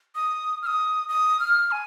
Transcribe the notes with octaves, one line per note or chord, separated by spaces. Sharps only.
D#6
F6
D#6
D#6
F6
G#5